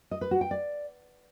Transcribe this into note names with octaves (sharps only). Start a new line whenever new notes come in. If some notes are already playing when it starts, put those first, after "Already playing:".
D#5
B4
F#4
G5
D5